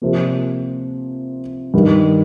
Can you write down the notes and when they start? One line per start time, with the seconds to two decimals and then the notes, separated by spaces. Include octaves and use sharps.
0.02 C3 F3 A#3
1.74 G2 D#3 G3